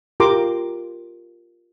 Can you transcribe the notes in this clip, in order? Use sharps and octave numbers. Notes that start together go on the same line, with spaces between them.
F4 G4 A#4 A#5 C6 D6